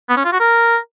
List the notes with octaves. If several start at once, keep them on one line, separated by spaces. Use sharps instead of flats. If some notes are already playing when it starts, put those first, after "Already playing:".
B3
C#4
F4
F#4
A#4